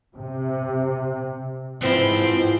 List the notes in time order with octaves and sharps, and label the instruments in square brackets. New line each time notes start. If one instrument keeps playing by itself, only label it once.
[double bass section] C3
[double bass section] G#2 [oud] E3 F3 E4 [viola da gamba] C4